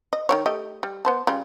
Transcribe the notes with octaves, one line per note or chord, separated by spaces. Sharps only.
D#5
D#3 A#3 C#5
A3 G4 D#5
G3
B3 C5 A5
C#3 G3 F4